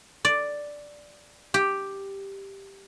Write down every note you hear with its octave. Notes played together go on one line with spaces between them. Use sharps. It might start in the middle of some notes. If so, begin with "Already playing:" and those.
D5
G4